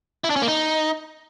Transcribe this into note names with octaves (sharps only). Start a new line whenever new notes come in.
E4
D4
C#4
A#3
D#4